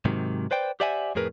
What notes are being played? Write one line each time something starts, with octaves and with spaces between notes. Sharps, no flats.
G#2 C3 D#3 F#3
B4 C5 D5 G5
G4 C5 D5 E5 F#5 G#5
F2 A2 G#4 A#4 B4